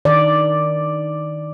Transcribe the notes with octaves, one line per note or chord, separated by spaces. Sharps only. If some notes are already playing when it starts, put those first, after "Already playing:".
D#3 D5